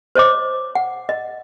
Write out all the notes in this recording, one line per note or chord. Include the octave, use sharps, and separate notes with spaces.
C5 C#5 D#5 D6
F#5
D#5